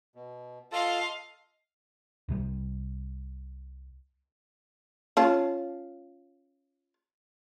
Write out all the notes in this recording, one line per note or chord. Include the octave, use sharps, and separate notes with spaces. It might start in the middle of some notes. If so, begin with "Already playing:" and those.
B2
F4 A4 D#5 F5 A5
C2 C3 F#3 G3
C#4 F4 A5